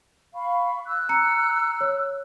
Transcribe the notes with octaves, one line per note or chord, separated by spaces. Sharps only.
F5 B5 C#6
E6 F#6
A#5 C#7
C#5